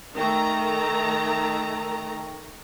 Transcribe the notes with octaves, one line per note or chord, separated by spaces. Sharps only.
D#3 A3 D#4 G5 A#5 C#6